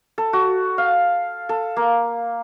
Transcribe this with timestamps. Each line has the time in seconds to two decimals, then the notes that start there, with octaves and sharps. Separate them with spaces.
0.18 A4
0.33 F#4
0.78 F5
1.49 A4
1.76 A#3